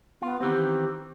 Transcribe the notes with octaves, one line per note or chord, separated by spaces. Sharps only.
B3 F4
D#3 E3 C4 G4